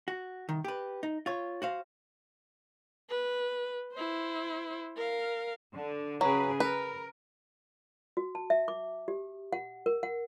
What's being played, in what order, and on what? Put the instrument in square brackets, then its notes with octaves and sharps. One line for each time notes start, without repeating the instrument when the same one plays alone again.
[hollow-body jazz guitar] F#4
C2 D#3
G4 B4
D#4
F4 C#5
F#4 C5 F5
[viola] B4
E4 C5
A#4 F5
[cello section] D3
[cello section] C#3 G#4 B4 [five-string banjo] F#3
[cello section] A#4 [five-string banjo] B4
[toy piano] F#4
A5
E5
D6
G4
F#5
A#4
F#5